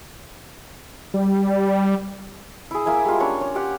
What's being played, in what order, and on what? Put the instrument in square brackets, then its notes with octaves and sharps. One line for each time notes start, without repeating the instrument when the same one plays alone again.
[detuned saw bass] G3
[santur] E4 G#4
A#3 E4 E5 G#5
G3 G#3 F4
C#4 D4 C#5
C#5
G4 F#5